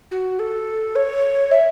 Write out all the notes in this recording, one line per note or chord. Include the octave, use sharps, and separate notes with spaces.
F#4
A4
C#5
E5